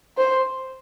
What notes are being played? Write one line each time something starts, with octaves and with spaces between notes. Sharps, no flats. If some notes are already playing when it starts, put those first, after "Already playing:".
C5